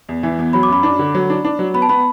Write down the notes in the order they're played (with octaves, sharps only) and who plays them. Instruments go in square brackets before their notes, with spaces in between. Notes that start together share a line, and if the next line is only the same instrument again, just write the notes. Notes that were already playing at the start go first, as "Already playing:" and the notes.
[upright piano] E2
E3
E2
[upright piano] F#3 [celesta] B5
[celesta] D6
[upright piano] F#2 [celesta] B5
[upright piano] D4
D3
F#3
D4
D4
F#3
[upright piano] B3 [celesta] B5
[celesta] A5
[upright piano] B3 [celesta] B5